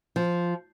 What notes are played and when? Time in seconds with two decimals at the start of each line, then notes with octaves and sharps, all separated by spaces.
0.16 F3